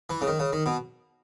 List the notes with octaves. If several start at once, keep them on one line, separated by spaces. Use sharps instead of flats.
E3
C#3
D#3
C#3
D#3
B2